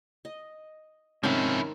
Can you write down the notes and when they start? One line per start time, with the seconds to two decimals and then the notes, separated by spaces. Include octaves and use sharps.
0.25 D#5
1.23 G#2 C3 D#3 F3 C#4 E4 A5 C6